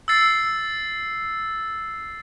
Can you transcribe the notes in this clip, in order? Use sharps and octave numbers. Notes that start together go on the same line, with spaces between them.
E6 A6 C7